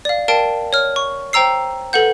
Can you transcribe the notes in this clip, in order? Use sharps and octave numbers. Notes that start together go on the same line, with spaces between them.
D5 F5
A#4 D5 F5 G5 A5 D7
C#5 F6
C#6
C5 G5 A#5 E6 C7
A4 B4 F#5 G6